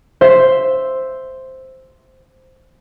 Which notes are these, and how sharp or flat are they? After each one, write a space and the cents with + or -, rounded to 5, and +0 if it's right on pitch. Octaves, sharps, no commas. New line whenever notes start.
C5 +0 E5 +0